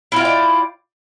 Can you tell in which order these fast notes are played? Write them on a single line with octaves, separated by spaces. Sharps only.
E4 F4 G5 D5